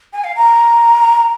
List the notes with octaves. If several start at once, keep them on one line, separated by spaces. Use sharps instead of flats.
G#5
F5
A#5